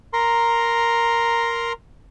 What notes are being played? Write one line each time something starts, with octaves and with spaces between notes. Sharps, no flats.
A#4 A#5 C6